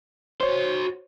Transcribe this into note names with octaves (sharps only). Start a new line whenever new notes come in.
F#4 C5 C#5 C6